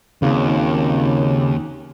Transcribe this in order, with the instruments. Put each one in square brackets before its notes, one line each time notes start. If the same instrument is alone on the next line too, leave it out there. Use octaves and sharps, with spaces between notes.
[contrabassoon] G#1 [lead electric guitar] D#2 [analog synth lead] C#3